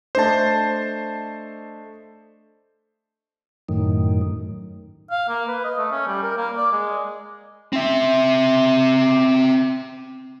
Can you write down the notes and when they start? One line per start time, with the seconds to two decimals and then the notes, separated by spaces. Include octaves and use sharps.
0.15 A3 D4 C5 D#5 A5
3.69 F#2 A2 D#3
5.11 F5
5.29 A#3
5.48 B4
5.64 D#5
5.78 A3
5.91 C#4
6.08 G3
6.22 A#4
6.37 A#3
6.57 D5
6.72 G#3
7.73 C4 E5